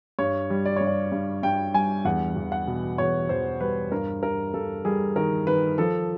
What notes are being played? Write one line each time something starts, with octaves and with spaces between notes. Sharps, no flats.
G2 C#5
G3
D5
G2 C#5
D5
G2
G2 G5
G3 G#5
E2 F#5
E2
F#5
B2
E2 C#5
E2 C5
G3 B4
G2 A#4
G2 A#4
G2 A4
G3 G#4
D#3 A#4
D#3 B4
F3 A4